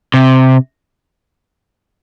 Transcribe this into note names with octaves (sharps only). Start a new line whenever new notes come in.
C3